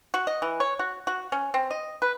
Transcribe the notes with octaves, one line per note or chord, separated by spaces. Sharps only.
F#4
D#5
E3
C#5
F#4
F#4
C#4
C4
D#5
B4